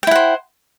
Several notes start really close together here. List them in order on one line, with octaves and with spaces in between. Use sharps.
G5 E4 F#5 C5